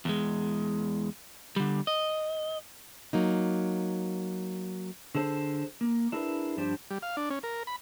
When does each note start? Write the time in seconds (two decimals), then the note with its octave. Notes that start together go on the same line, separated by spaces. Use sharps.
0.05 E2 G#3
1.56 D3 G3
1.87 D#5
3.13 F#3 A#3 D#4
5.15 D3 G#4 A4 C5
5.81 A#3
6.12 D4 E4 G#4 A#4 B4
6.57 G2 F3 D4 G4 C5
6.91 G3
7.03 F5
7.17 D4
7.30 C#4
7.43 A#4
7.67 B5